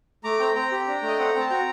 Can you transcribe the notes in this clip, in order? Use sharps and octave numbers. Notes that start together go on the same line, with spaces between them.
A3 A#5 D6
C4 G5 A#5
C4 G5 A#5
G4
D4
A3
D#5
C4 F#5
G5
C4
A5
F#4 G5 A#5